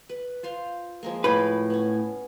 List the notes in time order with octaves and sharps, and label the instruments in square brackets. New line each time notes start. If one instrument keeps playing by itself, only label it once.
[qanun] B4
F4 C5 F5
F3 G#3 A#3
[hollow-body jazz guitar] A2 B4
[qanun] B3 C#4